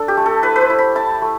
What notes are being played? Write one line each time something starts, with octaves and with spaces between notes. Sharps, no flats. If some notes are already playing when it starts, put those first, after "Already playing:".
Already playing: D4 A4
G4
A3
A4
E4 B4
B4
C5
E4
B5
E4 A5
A3